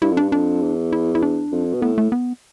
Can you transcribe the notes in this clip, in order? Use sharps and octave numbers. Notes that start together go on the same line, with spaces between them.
G2 E4
F2
G2 D4
F2 D4
E2
E4
E4
D4
F2
B2
A2 B3
A3
B3